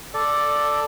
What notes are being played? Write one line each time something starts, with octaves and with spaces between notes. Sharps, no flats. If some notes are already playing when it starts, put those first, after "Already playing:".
A4 D5